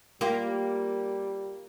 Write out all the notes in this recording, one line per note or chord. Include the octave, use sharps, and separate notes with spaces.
G3 A#3 F4 G4